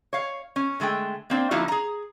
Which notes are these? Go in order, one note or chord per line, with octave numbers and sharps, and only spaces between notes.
C#5 F5
C#4
D3 G#3 A3 G5
A#3 C4 D4 C5
D3 F3 A#3 D#4 E4 F#4
G#4 A#5